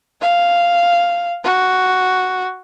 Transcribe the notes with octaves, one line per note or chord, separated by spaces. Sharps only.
F5
F#4